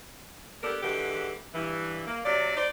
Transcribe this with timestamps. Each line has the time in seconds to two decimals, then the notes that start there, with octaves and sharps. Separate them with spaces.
0.63 B3 D4 G4 A4 A#4
0.83 D3 E3 G#3 F#4 G4
1.55 G2 E3
2.06 A#3
2.24 C3 F#3 D5
2.57 D#4 C5 D5